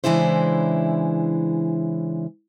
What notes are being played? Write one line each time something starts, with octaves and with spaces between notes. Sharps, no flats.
C#3 E3 G#3 D4 E4 C5